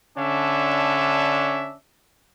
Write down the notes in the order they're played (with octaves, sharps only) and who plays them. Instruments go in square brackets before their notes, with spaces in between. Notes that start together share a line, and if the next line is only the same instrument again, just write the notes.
[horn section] D3 C#4 D4 E5